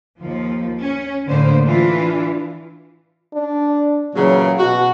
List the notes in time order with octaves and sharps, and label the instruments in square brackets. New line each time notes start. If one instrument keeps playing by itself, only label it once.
[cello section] D#2 F3
C#4
A2 D3 A#3 B3 C5
E3 D4 F4
[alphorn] D4
[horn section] A#2 C#3 F#3 [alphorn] E3
[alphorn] B2 [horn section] F#4